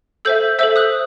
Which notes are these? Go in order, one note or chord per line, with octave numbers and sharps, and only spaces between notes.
A4 C5 E5 E6 G6
A4 C5 E5 E6 G6
D#6 F#6